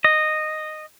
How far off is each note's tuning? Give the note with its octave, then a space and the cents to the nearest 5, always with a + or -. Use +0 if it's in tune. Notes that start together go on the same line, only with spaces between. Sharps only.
D#5 -10